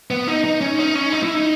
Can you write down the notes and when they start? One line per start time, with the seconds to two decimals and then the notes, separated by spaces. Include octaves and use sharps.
0.10 B3
0.28 D#4
0.44 D#4
0.61 C#4
0.79 D#4
0.95 C#4
1.12 D#4
1.23 E4
1.34 D#4